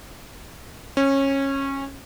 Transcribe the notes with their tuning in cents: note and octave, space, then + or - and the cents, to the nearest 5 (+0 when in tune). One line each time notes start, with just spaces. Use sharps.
C#4 -20